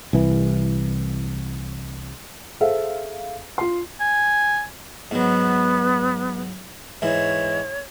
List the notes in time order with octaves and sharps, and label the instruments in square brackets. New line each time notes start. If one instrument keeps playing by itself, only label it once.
[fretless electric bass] C2 E3
[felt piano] G#4 A4 C5 E5 F5
F4 C6
[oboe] G#5
[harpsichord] G#2 F#3 [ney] B3
[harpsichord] G#2 E3 [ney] C#5